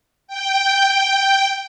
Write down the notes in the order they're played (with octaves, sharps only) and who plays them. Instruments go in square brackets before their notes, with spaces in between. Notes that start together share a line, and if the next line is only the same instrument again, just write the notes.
[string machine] G5